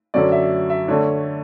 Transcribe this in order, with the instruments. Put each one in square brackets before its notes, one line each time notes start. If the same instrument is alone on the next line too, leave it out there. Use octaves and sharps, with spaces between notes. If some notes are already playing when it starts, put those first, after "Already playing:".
[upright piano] F#2 D3 F#3 C#4 D5
E5
E5
D3 A3 D4 C#5